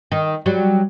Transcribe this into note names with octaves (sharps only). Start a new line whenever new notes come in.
D#3
F#3 G3